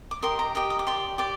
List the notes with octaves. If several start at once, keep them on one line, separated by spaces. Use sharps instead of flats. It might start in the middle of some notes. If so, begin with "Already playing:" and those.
D6
G4 A#4 D#5 C6
A#5
G4 A#4 D#5 A#5
D#6
D6
G4 D5 C6
G4 D5 D6